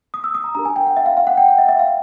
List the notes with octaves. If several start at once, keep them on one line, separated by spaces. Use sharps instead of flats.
D#6
E6
D#6
A#5
D4 G4 A#4 A#5
G#5
G5
F#5
E5
F5
F5
F#5
G5
F#5
E5
E5
F5